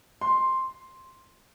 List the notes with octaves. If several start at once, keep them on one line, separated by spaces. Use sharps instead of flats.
C6